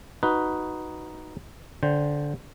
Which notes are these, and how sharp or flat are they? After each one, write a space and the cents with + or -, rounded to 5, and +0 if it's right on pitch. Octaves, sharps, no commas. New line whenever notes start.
D#4 +0 F#4 +0 B4 +0
D3 -15 C5 +0 G5 +0